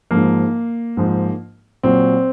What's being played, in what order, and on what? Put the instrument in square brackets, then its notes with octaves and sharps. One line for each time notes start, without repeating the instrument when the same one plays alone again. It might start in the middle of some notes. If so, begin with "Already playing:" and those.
[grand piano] G#2 F3 A#3
G#2 F3
A#2 F#3 C4